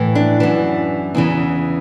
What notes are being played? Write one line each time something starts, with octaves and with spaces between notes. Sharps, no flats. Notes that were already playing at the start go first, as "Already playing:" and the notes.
Already playing: A2 E3
D4
F#2 E3
E2 C#3 E3